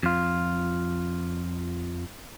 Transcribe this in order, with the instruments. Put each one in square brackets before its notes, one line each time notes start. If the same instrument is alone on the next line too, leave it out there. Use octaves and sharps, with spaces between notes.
[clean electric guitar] F2 F4